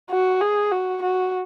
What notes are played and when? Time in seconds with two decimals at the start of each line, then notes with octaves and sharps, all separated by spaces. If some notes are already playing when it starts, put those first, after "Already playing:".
0.10 F#4
0.41 G#4
0.72 F#4
1.02 F#4